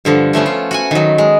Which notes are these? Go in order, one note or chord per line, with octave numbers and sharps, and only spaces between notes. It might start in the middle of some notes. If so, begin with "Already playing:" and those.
G2 D3 F3
F3 A3 B3 C#4
F4
F#4 F#5 G#5
D#3 F#3
G#3